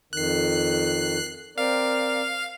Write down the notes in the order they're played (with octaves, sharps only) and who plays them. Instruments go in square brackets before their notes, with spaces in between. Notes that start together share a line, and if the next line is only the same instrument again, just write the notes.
[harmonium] F2 D#3 [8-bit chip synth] F#6 C7
[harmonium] C4 A#4 D5 [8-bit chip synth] F5